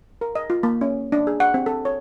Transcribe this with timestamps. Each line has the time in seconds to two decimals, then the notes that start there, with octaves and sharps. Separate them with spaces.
0.21 A#4
0.35 D#5
0.50 F4
0.63 A#3
0.81 C#4
1.12 D4
1.27 G#4
1.40 F#5
1.54 C4
1.66 A4
1.85 C#5